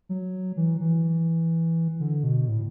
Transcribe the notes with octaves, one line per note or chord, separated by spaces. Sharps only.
F#3
E3
E3
D3
B2
A2